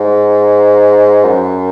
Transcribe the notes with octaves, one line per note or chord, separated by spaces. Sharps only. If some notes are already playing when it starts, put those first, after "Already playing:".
Already playing: G#2
F#2